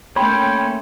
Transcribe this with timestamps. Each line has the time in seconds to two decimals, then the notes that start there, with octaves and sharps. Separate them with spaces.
0.16 A3 A#3 C#4 C#5 G5 B5 C6